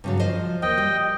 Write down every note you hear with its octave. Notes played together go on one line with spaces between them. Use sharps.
G2 C#3 F#3
F3 C5 D#5
D#2 D#5 G5
G3